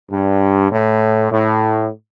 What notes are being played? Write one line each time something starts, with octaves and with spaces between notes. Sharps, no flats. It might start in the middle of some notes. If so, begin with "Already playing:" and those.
G2
A2
A2